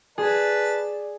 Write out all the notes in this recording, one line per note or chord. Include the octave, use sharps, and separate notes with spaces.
G#4 B4 D5 A5